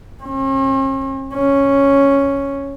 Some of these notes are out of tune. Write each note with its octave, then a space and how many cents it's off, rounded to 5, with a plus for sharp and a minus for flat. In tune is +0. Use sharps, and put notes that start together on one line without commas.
C#4 -45
C#4 +0